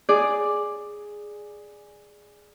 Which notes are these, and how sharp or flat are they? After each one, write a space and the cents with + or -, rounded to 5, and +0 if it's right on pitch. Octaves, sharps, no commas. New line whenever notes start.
G#4 +0 D5 +5